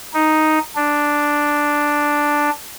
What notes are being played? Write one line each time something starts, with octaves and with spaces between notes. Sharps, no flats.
D#4
D4